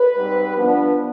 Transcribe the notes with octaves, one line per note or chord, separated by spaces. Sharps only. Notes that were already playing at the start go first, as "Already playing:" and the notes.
Already playing: B4
G#2 G3 C4
G2 F3 B3 D4